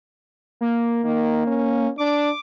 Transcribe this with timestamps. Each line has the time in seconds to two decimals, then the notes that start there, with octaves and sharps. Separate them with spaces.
0.61 A#3
1.04 D#3 A#3
1.47 C#4
1.98 D4 D6